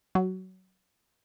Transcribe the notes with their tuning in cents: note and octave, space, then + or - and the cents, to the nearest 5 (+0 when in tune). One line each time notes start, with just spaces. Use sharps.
F#3 +15